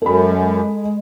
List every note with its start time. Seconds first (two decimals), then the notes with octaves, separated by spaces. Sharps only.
0.02 F#2 G#3 A4 B5
0.34 G#3